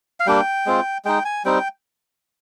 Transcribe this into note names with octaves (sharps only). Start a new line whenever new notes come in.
F5
G3 A#3 D4 G5
G#3 C4 F4
G#3 D#4 G5
G#5
G3 C4 D#4 G5